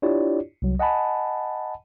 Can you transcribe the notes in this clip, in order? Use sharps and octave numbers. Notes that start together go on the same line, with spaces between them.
D4 E4 F4 G4 C#5 D5
C2 F#3
D#5 F#5 G#5 A5 B5